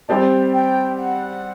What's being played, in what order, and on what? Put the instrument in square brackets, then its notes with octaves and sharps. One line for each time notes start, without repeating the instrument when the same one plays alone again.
[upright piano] G3 C4 G4 D5 [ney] G5 A5
[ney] G5
F#5